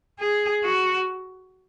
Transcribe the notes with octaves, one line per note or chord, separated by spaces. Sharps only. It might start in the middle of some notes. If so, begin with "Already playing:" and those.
G#4
F#4